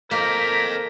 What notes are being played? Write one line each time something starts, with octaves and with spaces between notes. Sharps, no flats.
A#3 A4 A#4 C5 D#5 B6